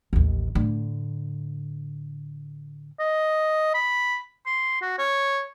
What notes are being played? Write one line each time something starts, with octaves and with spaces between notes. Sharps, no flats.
A1 D#2
A2 D3
D#5
B5
C6
F#4
C#5